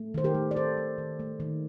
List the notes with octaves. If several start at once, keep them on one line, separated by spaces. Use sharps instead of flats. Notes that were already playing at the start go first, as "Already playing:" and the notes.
Already playing: A3
D#3 C5
G4 A#4
A3
D5
D#3 A4 C5
A3
D#3
A3
D#3